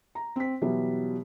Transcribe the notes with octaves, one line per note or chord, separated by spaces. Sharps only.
A#5
C4 B6
B2 E3 F#3 G3